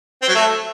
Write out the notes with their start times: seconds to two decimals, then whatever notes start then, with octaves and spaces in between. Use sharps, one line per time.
0.22 C4
0.28 F#3
0.35 A3